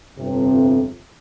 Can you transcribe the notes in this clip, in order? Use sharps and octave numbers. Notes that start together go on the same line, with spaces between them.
G1 F2 C3